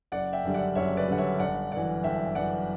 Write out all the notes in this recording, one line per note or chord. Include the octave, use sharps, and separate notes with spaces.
F#1 D5 F#5
E5 G5
F#2 D3 G3
D5 F#5
F#1 C#5 E5
B4 D5
F#2 D3 G3 F#5
C#5 E5
G1 D5 F#5
F#2 E3 D5 F#5
G1 E5 G5
F#2 E3 D5 F#5